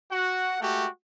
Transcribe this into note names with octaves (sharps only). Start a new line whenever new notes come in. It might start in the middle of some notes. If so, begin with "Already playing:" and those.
F#4 F#5
G#3 A3 F#4 G4